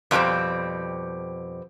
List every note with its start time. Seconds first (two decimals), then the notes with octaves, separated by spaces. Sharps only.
0.11 F2 B2 F#3 G3 C4